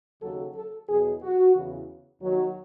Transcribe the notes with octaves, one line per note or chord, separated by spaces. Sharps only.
D#2 C#3 F#3 A4
A4
E2 B2 F#3 G#4
F#4
E2 C#3 E3
D#2 D#3 F#3